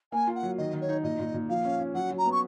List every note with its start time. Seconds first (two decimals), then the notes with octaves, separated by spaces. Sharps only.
0.12 A#3 G#5
0.27 F4
0.35 F#5
0.43 F#3
0.58 D#3 D#5
0.73 D#3
0.81 C#5
0.89 D#4
1.04 A#2 D#5
1.19 A#2
1.34 A#2
1.49 F3 F5
1.65 C#4
1.80 C#4
1.95 F#3 F#5
2.10 F#3
2.18 A#5
2.26 B3
2.32 C#6